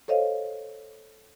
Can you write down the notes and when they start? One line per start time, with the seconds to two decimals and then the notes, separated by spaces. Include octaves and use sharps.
0.08 A4 C5 C#5 D#5 F5